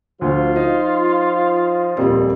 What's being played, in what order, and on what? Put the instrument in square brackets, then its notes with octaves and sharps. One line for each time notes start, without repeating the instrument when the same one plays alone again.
[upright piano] D2 [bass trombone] F3 [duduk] F4
[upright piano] D#4
[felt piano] D#1 F2 G3 [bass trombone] A#2